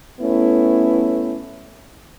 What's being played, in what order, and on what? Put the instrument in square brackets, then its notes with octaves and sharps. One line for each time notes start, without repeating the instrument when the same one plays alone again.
[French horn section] A3 B3 C#4 E4